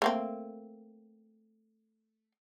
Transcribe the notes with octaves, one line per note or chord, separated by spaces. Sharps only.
A3 A#3 C4